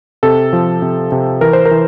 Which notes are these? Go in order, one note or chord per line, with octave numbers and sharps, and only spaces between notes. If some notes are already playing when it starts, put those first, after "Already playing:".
C3 A4
F3
C3
C3
E3 A#4
C5
A#4
E3